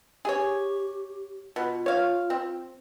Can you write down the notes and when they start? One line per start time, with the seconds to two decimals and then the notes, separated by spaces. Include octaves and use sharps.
0.25 G4 G#4 C#5
1.56 B2 F4
1.86 C#5 F5
2.30 C4